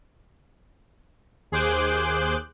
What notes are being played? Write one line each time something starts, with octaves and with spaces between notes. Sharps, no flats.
D#2 G#4 C5 D6 F#6 G6